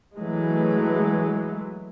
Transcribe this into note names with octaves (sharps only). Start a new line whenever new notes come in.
E3 F#3 G#3 A3